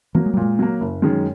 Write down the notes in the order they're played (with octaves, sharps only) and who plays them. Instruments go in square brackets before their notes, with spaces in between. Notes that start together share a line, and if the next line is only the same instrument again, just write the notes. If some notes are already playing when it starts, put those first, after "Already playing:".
[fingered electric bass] E3 [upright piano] F#3 A#3
[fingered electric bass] G#3
G3
[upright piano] A#2 [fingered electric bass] G#3
[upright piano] F#3 A#3
F#1
F#2 D#3 G#3 C#4